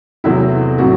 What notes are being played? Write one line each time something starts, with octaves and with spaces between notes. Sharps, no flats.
E2 C3 F#3 A3 C4 E4
A2 F#3 C4 F#4